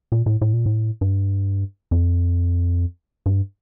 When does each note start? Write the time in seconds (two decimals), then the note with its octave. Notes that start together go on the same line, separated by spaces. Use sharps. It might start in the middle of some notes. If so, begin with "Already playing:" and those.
0.12 A#2
0.26 A2
0.41 A2
0.54 A#2
0.66 A2
1.01 G2
1.91 F2
3.26 G2